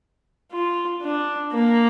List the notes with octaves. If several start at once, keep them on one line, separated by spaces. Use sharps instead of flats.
F4
D4
A#3